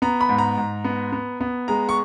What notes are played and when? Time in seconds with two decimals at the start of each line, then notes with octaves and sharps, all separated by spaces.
0.02 B3 A#5
0.21 B5
0.29 G#2
0.38 A#5
0.57 G#2
0.84 B3
1.13 B3
1.40 B3
1.68 G#3 A#5
1.89 C#6